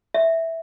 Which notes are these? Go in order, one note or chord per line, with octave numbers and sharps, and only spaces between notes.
E5